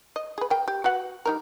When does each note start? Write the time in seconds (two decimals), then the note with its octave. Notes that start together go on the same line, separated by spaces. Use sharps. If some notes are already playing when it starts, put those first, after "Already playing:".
0.16 D#5
0.38 G#4 B4
0.50 A#4 G5
0.68 G4
0.84 F#4 B4 F#5
1.25 G3 D#4 A#4